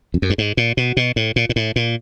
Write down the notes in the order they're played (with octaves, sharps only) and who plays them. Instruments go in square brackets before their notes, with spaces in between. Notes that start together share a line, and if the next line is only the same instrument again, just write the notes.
[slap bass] F2
F#2
G2
G#2
A#2
B2
B2
A2
A#2
A#2
A2
A#2